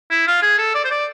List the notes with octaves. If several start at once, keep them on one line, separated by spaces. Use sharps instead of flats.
E4
F4
G#4
A4
D5
C5
D5